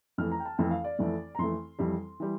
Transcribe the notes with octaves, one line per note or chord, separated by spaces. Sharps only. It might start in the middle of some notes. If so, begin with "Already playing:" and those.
F2 E3 A3 F6
A#5
G5
A5
F2 E3 A3 G5
F5
D5
F2 E3 A3
A#5
F2 E3 A3 C6
F2 E3 G3
E3 G3